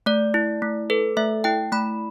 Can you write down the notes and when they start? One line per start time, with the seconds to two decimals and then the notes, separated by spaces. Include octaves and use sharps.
0.06 A3 D5
0.34 E4
0.62 A3
0.90 A4 B4
1.17 A3 E5
1.44 E4 G5
1.72 A3 B5